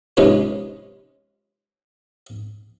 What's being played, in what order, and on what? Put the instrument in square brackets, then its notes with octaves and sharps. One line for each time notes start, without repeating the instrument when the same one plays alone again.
[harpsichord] C3 G#3 C#4 D#4 F4 B4